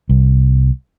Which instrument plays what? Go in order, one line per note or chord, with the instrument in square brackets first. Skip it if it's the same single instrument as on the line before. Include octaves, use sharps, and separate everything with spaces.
[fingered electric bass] C2